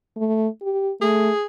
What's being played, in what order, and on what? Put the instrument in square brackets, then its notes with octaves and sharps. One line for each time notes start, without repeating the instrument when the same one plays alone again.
[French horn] A3
G4
[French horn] A3 [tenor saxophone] G#4